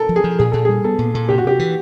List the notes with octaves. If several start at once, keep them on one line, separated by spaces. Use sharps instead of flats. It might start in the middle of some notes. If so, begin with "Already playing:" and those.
Already playing: A4 A#4
F3
G#4
F3
A#2 G#4
A#2 A4
G3 G#4
B3 A4
A#2
A#2 A4
C3 G4
F#4
C3 G4
E3